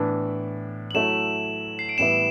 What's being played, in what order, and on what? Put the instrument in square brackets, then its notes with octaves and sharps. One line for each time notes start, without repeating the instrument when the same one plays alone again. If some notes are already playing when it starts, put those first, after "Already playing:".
Already playing: [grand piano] A2 E3 B3 D4
[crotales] F#7
[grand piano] F#3 A3 E4 [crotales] E7
[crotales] C7
D7
[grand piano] A2 E3 G3 B3 E4 [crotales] E7